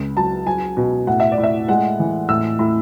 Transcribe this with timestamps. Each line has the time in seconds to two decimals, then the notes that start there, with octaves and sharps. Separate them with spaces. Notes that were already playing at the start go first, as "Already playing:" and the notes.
Already playing: C#2 C#3
0.16 F#3 A5
0.47 F#3 G#5
0.77 B2
1.07 A2 F#5
1.20 E5
1.32 D5
1.38 A2
1.43 E5
1.69 G#3 F#5
1.99 E3
2.29 A2 E6
2.59 A2